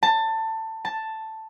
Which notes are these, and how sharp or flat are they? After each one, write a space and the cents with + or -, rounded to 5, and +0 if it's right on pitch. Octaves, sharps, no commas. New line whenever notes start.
A5 +20
A5 +5